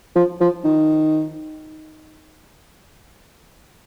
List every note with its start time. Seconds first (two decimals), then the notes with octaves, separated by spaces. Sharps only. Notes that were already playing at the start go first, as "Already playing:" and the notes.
0.16 F3
0.41 F3
0.64 D#3